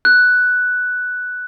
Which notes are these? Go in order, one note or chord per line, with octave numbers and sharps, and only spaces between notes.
F#6